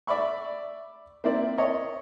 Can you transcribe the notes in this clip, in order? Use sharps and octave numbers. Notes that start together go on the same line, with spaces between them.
D5 E5 B5 C#6
A#3 C4 E4 D5
C#5 D#5